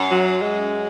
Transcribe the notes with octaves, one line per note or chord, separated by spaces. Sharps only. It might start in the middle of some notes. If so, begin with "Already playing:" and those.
Already playing: F#2
F#3
G#3